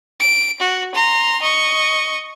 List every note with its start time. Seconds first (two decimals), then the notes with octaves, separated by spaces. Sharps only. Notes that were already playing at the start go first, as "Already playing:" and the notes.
0.20 D7
0.60 F#4
0.94 A#5 C6
1.42 D#5 C#6